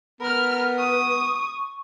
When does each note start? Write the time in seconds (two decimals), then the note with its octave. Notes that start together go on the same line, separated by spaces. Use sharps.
0.20 B3 A#4 B5 F6
0.78 C#6 D#6